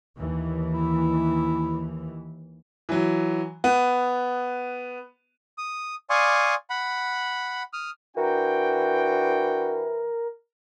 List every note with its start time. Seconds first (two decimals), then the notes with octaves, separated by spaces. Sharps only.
0.17 D#2 E3
0.74 E4
2.89 E3 F#3
3.64 B3
5.58 D#6
6.10 D5 F5 G#5 C6 C#6 D#6
6.70 F#5 B5
7.73 D#6 F6
8.17 E3 D4 F#4 A#4 G5